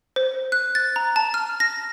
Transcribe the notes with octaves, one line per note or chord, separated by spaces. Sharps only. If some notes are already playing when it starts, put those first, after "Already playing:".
C5
F#6
A6
A#5
A5
F6
A#6